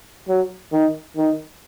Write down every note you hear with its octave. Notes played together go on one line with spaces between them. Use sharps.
F#3
D#3
D#3